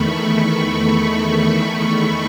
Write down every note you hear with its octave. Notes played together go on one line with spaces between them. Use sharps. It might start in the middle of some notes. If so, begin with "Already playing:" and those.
Already playing: E2 D#3 A3 B5 C#6
B5
C#6